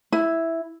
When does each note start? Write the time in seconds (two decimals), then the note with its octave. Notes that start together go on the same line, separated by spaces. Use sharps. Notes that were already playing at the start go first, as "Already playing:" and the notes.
0.12 E4